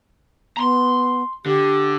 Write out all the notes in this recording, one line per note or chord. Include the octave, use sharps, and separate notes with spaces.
B3 A#5 C6
D3 G4